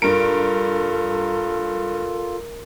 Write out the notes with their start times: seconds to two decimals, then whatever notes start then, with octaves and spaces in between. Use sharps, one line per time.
0.02 G2 F4 A4 A#4 D7